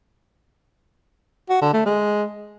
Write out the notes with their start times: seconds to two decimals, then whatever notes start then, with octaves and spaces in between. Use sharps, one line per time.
1.50 F#4
1.62 D3
1.74 A3
1.86 G#3